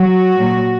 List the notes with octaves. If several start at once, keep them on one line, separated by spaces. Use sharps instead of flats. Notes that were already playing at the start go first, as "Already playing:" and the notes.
Already playing: F#3 F#4
A#2 F#3